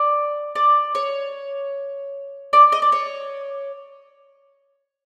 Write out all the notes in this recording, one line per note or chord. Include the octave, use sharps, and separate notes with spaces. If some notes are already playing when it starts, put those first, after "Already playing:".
Already playing: D5
D5
C#5
D5
D#5
D5
C#5